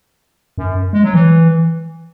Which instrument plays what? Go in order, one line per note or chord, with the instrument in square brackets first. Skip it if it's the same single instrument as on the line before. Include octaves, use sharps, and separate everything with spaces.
[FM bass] F#2
G#3
F#3
E3